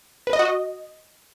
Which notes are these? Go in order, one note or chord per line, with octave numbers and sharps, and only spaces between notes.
B4
D#5
F#4
D#5